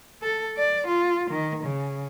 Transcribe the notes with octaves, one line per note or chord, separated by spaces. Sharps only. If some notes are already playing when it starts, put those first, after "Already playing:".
A4
D5
F4
D#3
C#3